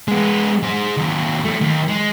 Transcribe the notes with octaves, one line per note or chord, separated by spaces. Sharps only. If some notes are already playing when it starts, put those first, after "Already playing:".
G#3 B3
G#3 C5
D#2 F#3
F#2 A3
D#2
G#3